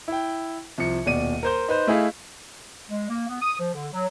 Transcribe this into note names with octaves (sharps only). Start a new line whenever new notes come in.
E4 G5
C2 F3 C#7
D#1 B2 D5 D#7
A#4 C5 G6
D#4 B4 C5
A3 E4 G#4 D#5 F5
G#3
A#3
B3
D#6
F3
D3
F#3